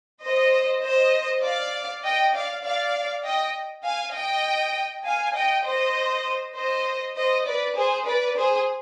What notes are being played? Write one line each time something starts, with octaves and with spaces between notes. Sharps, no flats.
C5 D#5
C5 D#5
D5 F5
D#5 G5
D5 F5
D5 F5
D#5 G5
F5 G#5
D#5 G5
F5 G#5
D#5 G5
C5 D#5
C5 D#5
C5 D#5
B4 D5
G#4 C5
B4 D5
G#4 C5